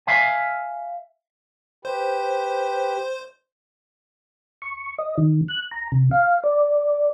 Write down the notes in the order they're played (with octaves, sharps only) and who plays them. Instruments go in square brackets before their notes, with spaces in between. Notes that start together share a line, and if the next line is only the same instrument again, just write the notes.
[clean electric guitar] E5 F5 G#5
[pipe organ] G4 B4 [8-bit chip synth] C5
[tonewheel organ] C#6
D#5
D#3
F#6
A#5
C3
F5
D5